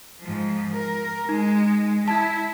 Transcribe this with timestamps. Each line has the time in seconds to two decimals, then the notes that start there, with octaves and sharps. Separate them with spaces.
0.21 G#2 F3
0.73 A#4
1.29 G#3 D#4
2.08 E4 A5 G#6